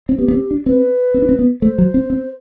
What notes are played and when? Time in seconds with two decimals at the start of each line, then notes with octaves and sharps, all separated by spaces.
0.09 C4
0.18 B3 G4
0.28 B3
0.34 C4
0.51 D4
0.66 C4 B4
1.14 C4
1.22 D4
1.29 C4
1.39 B3
1.62 A3 C5
1.78 F#3
1.94 C4
2.10 C4